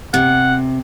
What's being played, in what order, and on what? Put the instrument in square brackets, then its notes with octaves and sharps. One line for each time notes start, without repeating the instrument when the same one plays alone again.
[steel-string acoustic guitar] C3 [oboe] F#5